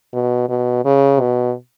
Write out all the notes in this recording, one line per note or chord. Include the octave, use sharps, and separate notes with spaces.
B2
B2
C#3
B2